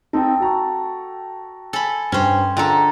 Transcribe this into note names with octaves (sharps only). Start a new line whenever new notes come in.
C4 D#4 A4 G5
F#4 A#5 C#6
A4 G#5 B5 C6
G2 C#4 C5 G5
D3 G#3 F4 A4 A#4 G5